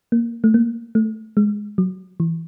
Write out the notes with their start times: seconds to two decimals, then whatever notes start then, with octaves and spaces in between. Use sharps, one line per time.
0.12 A#3
0.44 A3
0.54 A#3
0.95 A3
1.37 G#3
1.78 F#3
2.20 E3